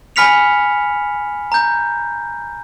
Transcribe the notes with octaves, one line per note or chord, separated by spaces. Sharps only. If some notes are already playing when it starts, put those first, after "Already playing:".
G#5 B5 F6 B6 C#7 F7
A#5 G6